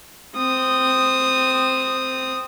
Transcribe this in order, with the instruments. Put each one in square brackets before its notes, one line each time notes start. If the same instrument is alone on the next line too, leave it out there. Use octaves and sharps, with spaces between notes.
[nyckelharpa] C4 D#6